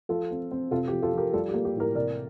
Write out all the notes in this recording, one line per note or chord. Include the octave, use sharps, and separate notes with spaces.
F3 F4 A4
C4
C4
C3 F4 A4
G4
F3
F4 A4
F3 G4 A#4
G3 F4 A4
G4
A#3
G4
A2 G4 A#4
C3 A#4 D5